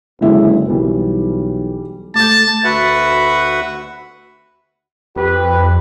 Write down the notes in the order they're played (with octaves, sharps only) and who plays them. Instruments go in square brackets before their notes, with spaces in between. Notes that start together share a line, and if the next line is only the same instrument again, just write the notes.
[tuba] F#1 [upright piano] D3 G#3 E4
[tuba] B1 [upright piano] E3 G3
[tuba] A3 [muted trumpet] A5 [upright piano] D6 G6
[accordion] D2 F#4 B4 E5 F#5
[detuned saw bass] F2 [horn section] G4 B4